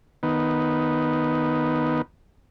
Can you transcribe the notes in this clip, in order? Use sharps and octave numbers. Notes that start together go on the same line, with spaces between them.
D#3 B3